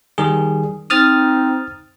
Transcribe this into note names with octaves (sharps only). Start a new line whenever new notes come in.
D#3 G3 G#4
C4 D#4 D#6 F6 A6